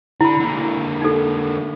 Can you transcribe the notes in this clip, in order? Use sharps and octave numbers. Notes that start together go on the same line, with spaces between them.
D3 E4 B5
D3 A#3
D#4 A4